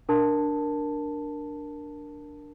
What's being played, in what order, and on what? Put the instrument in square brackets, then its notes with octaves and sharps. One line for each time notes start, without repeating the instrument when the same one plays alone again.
[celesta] D4 A#4 A5